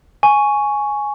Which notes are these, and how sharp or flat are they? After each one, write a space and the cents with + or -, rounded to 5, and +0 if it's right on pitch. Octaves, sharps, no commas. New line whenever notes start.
G#5 +5 C#6 +5